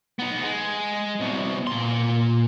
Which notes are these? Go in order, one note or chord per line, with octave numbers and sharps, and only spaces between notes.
B3 D#4
G#3
C2 B2
A#2 C6